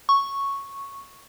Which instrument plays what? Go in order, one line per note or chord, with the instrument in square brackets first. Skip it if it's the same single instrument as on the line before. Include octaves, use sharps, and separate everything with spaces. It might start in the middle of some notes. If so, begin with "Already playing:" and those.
[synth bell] C#6